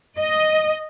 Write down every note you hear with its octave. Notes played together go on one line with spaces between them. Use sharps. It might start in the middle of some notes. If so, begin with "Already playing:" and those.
D#5